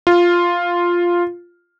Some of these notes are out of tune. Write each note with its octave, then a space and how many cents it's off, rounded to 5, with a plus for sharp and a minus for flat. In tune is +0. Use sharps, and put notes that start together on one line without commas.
F4 +0